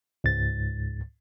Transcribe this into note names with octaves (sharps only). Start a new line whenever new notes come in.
C#2 G#2 A6